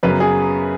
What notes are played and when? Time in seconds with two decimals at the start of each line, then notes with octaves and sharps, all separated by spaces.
0.03 F#2 C#3 F#3 B3 B4
0.20 G#4